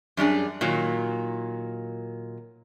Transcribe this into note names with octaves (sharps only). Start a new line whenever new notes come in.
F#2 G3 D4 G#4
A#2 D#3 F#3